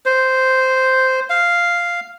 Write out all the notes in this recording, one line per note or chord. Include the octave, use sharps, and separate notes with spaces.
C5
F5